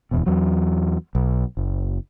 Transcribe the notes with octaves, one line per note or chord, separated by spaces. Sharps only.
D1 E2 B2
E2 F#3
B1
F#1